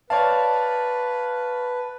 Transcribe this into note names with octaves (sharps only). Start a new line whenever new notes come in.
B4 C#5 D5 F5 A5